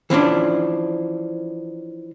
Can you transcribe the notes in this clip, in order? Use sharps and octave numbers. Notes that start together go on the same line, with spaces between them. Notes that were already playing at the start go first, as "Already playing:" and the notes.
E3 F3 C#4 D4